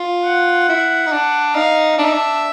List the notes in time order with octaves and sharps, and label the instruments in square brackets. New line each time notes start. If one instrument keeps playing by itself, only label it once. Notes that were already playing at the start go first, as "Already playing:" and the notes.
Already playing: [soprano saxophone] F4
[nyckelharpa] F#5
[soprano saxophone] E4
D#4
D4
[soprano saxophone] D#4 [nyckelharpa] F5
[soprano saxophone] D4 [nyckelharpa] E5
[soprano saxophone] D#4
D4